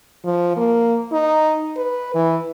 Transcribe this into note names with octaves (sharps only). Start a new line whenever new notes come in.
F3
A#3
D#4
B4
E3